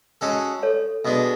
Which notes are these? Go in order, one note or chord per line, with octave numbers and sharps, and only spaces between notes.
G#3 C#4 F#4 A4
A4 C#5
B2 G#3 D4